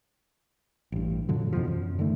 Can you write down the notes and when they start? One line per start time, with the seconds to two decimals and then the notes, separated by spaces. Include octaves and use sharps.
0.92 A1 G2
1.29 F#2 A#2 D3 F#3
1.53 F2 B2 E3 F3
1.67 F#2
1.99 D3 D#3 A3